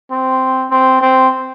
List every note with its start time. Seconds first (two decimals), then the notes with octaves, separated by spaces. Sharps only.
0.11 C4
0.71 C4
1.01 C4